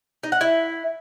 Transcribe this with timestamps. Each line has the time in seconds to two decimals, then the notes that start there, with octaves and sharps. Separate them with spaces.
0.23 D#4
0.32 F#5
0.41 E4